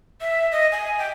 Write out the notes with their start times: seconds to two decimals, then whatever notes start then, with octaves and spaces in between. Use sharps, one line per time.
0.21 E5
0.52 D#5
0.72 G#5
0.99 G5